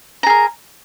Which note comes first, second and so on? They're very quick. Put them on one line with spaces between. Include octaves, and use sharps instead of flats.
A#5 G#4 A#4